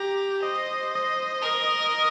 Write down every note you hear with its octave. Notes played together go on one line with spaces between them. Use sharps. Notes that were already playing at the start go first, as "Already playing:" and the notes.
Already playing: G4 A#5
C5 D#5
D#5
A#4